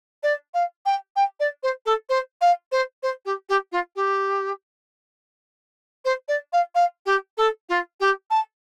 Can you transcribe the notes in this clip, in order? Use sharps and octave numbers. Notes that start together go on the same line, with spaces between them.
D5
F5
G5
G5
D5
C5
A4
C5
F5
C5
C5
G4
G4
F4
G4
C5
D5
F5
F5
G4
A4
F4
G4
A5